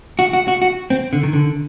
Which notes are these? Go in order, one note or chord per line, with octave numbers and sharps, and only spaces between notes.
F#4
F#4
F#4
F#4
C4
D3
D#3
D3